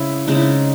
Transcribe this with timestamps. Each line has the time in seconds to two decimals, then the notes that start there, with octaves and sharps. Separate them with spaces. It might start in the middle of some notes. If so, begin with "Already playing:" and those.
Already playing: C#3 G#3 C4 E4
0.27 C#3 G#3 C4 D#4
0.35 E4
0.42 D#4